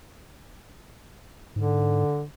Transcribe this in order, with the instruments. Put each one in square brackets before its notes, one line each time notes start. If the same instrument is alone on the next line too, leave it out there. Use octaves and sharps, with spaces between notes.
[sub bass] G#2 [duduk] D3